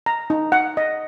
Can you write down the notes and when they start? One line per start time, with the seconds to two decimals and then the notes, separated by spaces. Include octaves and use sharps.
0.06 A#5
0.30 D#4
0.52 F#5
0.77 D#5